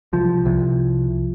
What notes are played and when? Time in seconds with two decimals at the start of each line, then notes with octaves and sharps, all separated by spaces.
0.13 C2 F3
0.46 C2